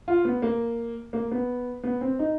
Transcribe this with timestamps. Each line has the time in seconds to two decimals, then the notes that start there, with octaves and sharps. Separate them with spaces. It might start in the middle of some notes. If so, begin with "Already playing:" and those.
0.08 F4
0.25 B3
0.42 A#3
1.13 A#3
1.31 B3
1.84 B3
2.01 C4
2.19 D#4